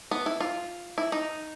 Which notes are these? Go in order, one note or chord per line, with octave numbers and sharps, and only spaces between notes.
B3
E4
F4
E4
D#4